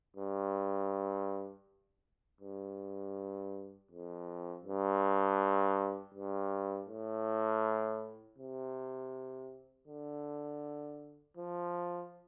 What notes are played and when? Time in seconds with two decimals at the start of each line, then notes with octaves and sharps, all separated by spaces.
0.17 G2
2.41 G2
3.91 F2
4.65 G2
6.14 G2
6.89 A2
8.38 C3
9.88 D3
11.37 F3